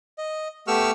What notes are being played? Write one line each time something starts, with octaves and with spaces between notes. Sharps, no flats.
D#5
A3 B3 G4 C#6 E6 F6